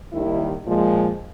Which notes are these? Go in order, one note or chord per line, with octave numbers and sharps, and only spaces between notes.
D#2 D#3 G3 E4
A#2 F3 G#3